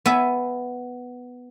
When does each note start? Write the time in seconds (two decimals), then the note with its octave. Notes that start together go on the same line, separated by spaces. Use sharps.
0.06 B3 E5 G#5